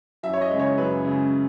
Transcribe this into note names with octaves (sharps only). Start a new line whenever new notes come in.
F#2 E5
C#5
D#5
C#3 G#3
C#5
F#2 B4
C#3 G#3